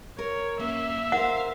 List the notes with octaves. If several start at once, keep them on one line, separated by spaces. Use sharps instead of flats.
A#4 C#5
F#2 A#3 E5
A#4 C5 F5 F#5